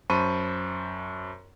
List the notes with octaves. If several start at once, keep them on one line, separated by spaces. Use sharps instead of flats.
F#2 C5 A5 B5 C#6 D#7